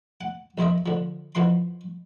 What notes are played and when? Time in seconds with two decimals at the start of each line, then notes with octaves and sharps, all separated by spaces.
0.21 F#5
0.58 A#1 D#3 C5 D#5 E5
0.86 D3 F3
1.35 F2 E3 F3 F#5 C6